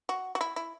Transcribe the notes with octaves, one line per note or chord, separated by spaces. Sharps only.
F#4
F#4
E4
E4